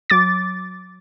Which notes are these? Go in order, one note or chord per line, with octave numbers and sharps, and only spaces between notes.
F#3 D6 A6